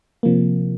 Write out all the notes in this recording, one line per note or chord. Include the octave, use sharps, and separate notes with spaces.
C3 F3 A#3